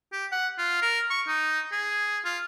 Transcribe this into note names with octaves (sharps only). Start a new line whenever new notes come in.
G4
F#5
F4
A#4
C#6
D#4
G#4
F4